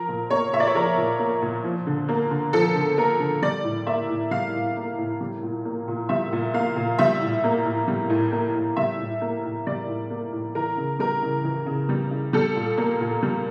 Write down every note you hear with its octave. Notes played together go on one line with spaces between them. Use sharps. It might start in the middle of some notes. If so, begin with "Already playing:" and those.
Already playing: F3 A#4
A#2
A#3 C#5
A#2 E5
D5
C#5
F3 A#4
A#2
A#3
A#2
F3
D3
A#3
D3
F3 A4
D3
A#3 A#4
D3
G3 D5
A2
A#3 E5
A2
G3 F5
A2
A#3
A2
G3
A#2
A#3
A#2
G3 E5
A#2
A#3 F5
A#2
G3 E5
A2
A#3
A2
G3
A2
A#3
A2
G3 E5
A2
A#3
A2
G3 D5
A2
A#3
A2
E3 A#4
C#3
G3 A#4
C#3
E3
C#3
G3
C#3
G3 A4
A#2
A#3
A#2
G3